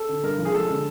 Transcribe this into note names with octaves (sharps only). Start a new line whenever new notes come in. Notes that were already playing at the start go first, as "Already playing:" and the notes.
Already playing: A4
D3
G2 A#4
F3
G#4
G#3 A4
D3